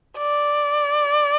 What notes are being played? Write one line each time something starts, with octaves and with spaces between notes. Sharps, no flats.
D5